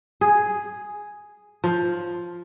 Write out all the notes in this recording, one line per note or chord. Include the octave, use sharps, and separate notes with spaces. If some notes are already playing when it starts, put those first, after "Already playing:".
G#4
F3